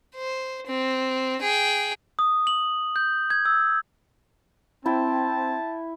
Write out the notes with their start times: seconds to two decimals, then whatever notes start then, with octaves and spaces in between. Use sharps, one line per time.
0.15 C5
0.67 C4
1.42 G#4 G5
2.19 D#6
2.47 F#7
2.96 G6
3.30 G#6
3.45 E6
4.86 C4 E4 G5 A5